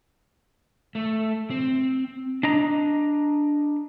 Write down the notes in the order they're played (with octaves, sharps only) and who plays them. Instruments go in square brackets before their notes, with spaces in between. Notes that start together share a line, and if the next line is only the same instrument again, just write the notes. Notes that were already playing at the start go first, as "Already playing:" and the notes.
[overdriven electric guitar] A3
C4
[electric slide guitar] D4 D#5 A#5